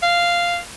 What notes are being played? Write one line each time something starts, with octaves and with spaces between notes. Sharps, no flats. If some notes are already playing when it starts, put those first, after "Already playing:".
F5